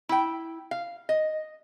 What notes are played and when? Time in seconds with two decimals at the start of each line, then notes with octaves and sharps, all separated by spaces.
0.09 E4 G5
0.71 F5
1.09 D#5